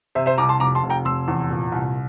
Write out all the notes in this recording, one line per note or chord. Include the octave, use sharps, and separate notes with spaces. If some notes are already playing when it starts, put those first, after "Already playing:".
C3 C5 E5
C5 E5
C2 A#5 D6
A5 C6
F1 A#5 D6
A5 C6
F1
G5 A#5
F1 C6 E6
E2
A#2
C2